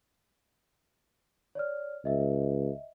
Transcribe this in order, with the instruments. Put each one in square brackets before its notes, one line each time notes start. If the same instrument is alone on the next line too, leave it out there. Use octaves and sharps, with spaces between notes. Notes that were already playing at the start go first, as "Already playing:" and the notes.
[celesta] C#5 D5 F6
[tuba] C#2 [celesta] D#5 E5